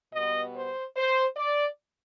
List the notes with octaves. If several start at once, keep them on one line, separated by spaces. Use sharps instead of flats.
B2 G3 B3 D#5
C5
C5
D5